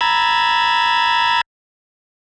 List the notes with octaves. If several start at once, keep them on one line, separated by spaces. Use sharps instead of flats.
A#5 B5 E6 G#6 A6